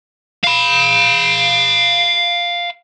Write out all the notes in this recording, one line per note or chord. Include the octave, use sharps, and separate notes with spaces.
F5 B5